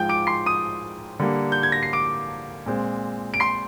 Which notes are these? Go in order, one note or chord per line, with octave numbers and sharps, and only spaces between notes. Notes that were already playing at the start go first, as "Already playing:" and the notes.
Already playing: G#2 F3 G#3 G5 G6
D6 D7
C6 C7
D#6 D#7
D3 G3 A#3
G6
G#6
A#6
C7
D6 D7
A#2 G#3 C4
D7
C6 C7